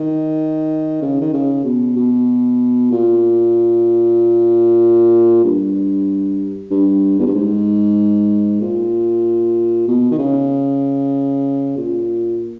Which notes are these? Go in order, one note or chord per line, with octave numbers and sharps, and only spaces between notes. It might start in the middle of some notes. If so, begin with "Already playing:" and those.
Already playing: D#3
C#3
D#3
C#3
B2
B2
A#2
G2
G2
E2
G2
G#2
A#2
B2
D#3
C#3
A#2